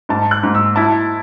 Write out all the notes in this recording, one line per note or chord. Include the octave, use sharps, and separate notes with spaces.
G#2 A5
F#6
G#2
E6
E4 A5